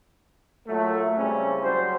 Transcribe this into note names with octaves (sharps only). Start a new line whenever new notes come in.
A#2 F#3 A3
C#3 G3 C4 C#4 E4
F#3 G3 C5